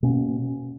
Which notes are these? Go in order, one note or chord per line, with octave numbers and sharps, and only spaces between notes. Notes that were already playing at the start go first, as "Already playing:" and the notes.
B2 A#3 C#4